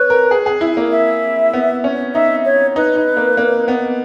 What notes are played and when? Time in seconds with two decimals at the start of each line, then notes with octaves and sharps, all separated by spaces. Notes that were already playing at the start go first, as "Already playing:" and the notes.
Already playing: B4 C#5
0.10 A#4
0.31 G#4
0.46 G#4
0.61 E4
0.77 A#3
0.91 E5
1.53 B3
1.84 C#4
2.14 D#4 E5
2.45 C#5
2.76 D#4 B4
2.96 D#4
3.17 A#3
3.37 A#3
3.68 B3